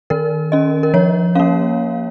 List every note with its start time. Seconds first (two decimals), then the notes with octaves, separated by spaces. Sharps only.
0.10 D#3 A#4
0.52 C#4 D#5
0.83 A#4
0.94 F3 C#5
1.35 A#3 C#4 F5